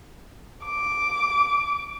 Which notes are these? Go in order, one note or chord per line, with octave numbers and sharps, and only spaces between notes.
D6